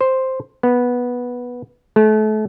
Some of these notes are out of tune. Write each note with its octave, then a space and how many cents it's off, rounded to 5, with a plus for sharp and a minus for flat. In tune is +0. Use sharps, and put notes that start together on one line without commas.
C5 +0
B3 -10
A3 -35